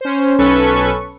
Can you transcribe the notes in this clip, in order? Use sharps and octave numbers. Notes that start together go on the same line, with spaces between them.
C#4 C5
B1 C#4 A4 B4 C#6